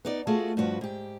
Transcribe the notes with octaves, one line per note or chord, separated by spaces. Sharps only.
B3 D#4 D5
A3 F4 F#4 G#4 D#5
G2 F3 F#4 B4
G#2 G4